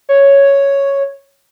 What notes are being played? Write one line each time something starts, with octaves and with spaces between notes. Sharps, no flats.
C#5